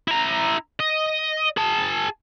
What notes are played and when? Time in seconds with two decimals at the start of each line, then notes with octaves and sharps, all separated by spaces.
0.08 E4 A#5
0.80 D#5
1.57 G#4 A5